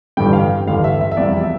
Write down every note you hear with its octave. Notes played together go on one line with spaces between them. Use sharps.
A1 G2 D3 G3 G5
F5
A1 G2 D3 G3 F5
E5
E5
E5
F1 E2 C3 G3 D5
E5